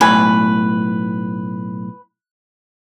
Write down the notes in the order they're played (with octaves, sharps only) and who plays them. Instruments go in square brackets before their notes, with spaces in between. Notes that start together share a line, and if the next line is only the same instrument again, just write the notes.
[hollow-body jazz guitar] B1 A2 G#5 [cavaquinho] B4